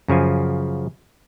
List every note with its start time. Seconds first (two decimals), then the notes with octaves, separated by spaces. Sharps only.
0.08 F#2 C#3 F3 G#5